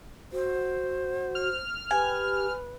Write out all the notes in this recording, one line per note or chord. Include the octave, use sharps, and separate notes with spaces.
F#4 C5
F6
G4 B4 G#5